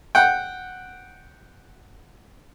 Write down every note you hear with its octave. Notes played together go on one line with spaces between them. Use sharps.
F#5 G5